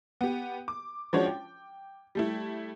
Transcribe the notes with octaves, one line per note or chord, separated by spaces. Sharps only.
B3 G4
D6
F3 G#3 C#4 D4 F#4 C#5
G5
G3 A3 E4